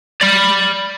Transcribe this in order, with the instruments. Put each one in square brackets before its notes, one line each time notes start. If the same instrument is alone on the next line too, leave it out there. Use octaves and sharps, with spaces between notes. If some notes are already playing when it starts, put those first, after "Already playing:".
[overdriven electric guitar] D5 B5